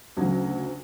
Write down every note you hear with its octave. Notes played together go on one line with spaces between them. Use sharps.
D2 C#3 F#3